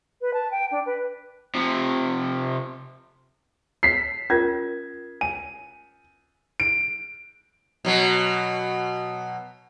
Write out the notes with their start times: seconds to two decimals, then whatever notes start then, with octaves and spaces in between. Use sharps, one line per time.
0.21 B4
0.33 A5
0.51 G5
0.71 D4
0.85 B4
1.55 C3 F3
3.83 B6 C7
4.30 C#4 F4 A#4 G#6
5.21 G#5 D#7
6.60 D7
7.85 B2 F#3